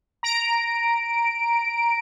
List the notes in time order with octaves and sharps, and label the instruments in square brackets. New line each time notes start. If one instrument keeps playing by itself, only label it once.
[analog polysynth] A#5 D7